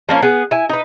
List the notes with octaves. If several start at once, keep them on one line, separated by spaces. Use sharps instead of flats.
F3 A#3 C#4
B3 G#4
E4 G#5
D#4 B4